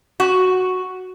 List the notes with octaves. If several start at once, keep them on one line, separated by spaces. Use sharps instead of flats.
F#4